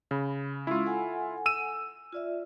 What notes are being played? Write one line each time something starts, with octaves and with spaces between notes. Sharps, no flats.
C#3 B5
G#3 C#4 E4 F4 E6
A4 F#5 G#5
E6 D#7 E7
F4 D5 E5